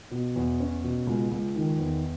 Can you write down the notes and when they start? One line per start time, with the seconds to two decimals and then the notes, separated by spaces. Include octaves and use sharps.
0.11 B2
0.36 E2
0.60 C#4
0.83 B2
1.07 C#2
1.31 C#2
1.56 D#3
1.79 E2